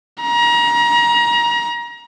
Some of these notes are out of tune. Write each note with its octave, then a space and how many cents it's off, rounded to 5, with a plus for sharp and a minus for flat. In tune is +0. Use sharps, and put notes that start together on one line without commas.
A#5 +30